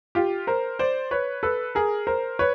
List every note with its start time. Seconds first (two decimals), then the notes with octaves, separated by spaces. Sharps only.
0.15 F4 G4
0.47 A#4 C5
0.79 C5 D5
1.11 B4 C#5
1.43 A4 B4
1.75 G#4 A#4
2.07 A#4 C5
2.39 B4 C#5